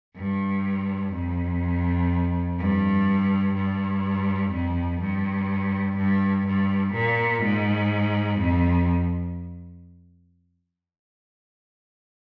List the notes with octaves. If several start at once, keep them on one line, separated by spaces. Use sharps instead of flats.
G2
F2
G2
G2
F2
G2
G2
G2
A#2
G#2
F2